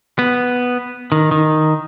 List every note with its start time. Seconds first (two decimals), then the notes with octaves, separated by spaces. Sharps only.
0.19 B3
1.12 D#3
1.31 D#3